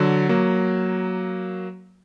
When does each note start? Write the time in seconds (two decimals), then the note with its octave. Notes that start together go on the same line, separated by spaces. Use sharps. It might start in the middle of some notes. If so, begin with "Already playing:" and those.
Already playing: D3 F#3
0.29 F#3 A#3